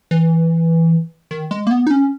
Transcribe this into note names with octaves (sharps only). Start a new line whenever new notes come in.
E3
D#3
G#3
A#3
B3
D#4
C#4